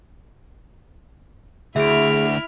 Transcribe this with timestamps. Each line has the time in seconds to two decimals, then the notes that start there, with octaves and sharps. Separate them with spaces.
1.76 D2 E4 G#4 E5 F6 D7